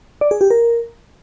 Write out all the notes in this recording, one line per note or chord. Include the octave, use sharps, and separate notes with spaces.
D5
G#4
G4
A#4